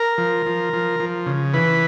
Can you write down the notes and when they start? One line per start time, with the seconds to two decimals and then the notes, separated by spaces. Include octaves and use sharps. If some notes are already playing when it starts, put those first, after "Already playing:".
Already playing: A#4
0.18 F3
0.46 F3
0.73 F3
1.00 F3
1.26 C#3
1.54 E3 B4